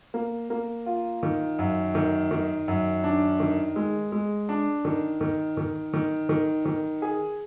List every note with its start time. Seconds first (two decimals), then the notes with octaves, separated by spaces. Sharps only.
0.14 A#3
0.50 A#3
0.86 F4
1.23 D#3
1.59 F#2
1.95 D#3
2.31 D#3
2.68 F#2
3.04 D4
3.40 D#3
3.76 G#3
4.12 G#3
4.49 D4
4.85 D#3
5.21 D#3
5.57 D#3
5.94 D#3
6.29 D#3
6.65 D#3
7.02 G#4